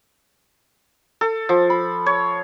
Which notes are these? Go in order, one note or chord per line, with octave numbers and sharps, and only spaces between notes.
A4
F3
B5
C#5